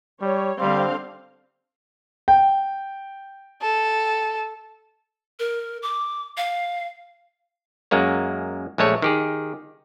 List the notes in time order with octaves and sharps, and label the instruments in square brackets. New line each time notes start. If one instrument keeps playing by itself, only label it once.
[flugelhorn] G3 [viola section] C#5
[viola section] D3 C4 F5 [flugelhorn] G3
[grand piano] G5
[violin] A4
[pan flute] A#4
D6
F5
[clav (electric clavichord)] F#2 G#3 A#3 C#5
A#1 G#3 A3 C#5
D#3 G4 G#4